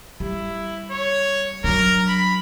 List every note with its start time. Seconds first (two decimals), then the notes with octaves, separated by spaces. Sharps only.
0.20 G3 E4
0.91 C#5
1.64 F#3 D4 A#4
2.08 B5